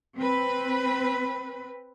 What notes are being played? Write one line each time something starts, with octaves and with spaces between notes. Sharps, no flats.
C4 B4